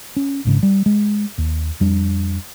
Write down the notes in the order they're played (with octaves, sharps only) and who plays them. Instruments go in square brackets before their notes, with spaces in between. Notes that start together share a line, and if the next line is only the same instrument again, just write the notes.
[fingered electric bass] C#4
G#1 G#2 C#3
G3
G#3
D#2
F2 G3 D4